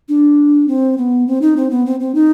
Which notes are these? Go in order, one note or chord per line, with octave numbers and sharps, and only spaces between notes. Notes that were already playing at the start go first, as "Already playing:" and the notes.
D4
C4
B3
C4
D#4
C4
B3
C4
C4
D#4